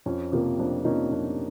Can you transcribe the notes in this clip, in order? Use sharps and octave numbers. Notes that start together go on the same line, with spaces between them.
F2 C#4
C3 F3 A#3
F2 D4
C3 F3 A#3 C#4 D#4
F2 D4